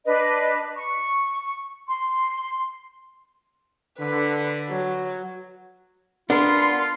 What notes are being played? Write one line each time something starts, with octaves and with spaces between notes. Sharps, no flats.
D4 B4 D#5
C#6
C6
D3 B4
F#3
B3 D4 F4 A#4 C6